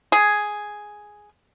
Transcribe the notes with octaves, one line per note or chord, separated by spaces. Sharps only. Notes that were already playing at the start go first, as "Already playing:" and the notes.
G#4